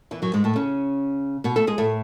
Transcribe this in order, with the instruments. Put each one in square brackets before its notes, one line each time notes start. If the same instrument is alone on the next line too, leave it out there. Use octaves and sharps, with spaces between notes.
[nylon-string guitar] E2 E3
F#2 F#3
G#2 G#3
A2 A3
C#3 C#4
B2 B3
A3 A4
G#3 G#4
A2 A3